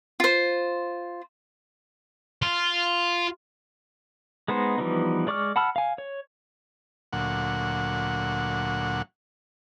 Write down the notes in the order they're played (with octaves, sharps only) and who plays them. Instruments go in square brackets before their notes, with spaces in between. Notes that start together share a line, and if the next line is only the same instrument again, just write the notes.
[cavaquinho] F4 C5
[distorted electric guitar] F4
[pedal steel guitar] G#3 B3 D#4 C5
E3 F3 G3 B3 D#4
G#3 D5 C#6 D6 F6
F#5 A5 B5 E6 F6
F5 G#5
C#5
[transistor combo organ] D2 A#2 F#3 F#5